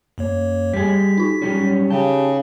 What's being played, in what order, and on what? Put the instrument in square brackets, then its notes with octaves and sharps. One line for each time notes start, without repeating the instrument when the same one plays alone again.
[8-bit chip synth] F#2 A#3 C#5
[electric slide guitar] G3 G#4 [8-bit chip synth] B6
[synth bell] D#4 F4
[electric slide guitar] F#3 G3 C#4
[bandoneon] C#3 [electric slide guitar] G4 [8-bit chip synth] A5